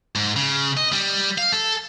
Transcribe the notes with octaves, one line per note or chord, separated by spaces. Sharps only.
G#2
C#3
D#5
G3
F5
A4